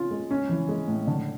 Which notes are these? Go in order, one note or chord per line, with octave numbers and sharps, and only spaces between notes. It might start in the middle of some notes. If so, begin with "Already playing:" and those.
Already playing: C#4 F4
G#3
C#4
E3
G#3
A2
D3